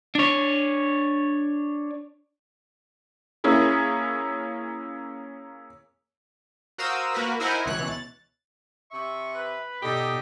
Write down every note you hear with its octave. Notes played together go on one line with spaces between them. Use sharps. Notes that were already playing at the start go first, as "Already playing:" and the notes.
D4 C#5
A#3 C#4 E4 G#4
F#4 A#4 C5 F5 D#6 E6
A#3 F#4 A#4 B4
D#4 E4 A#4 C5 F#5 G#5
C#2 B2 E3 C#5 F#6
A6
C3 E5 C#6
B4
B2 D#4 G4 A4 D5 D#5